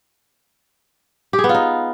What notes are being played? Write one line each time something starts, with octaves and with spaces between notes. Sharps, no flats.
G4
G#4
B3
F4
D#4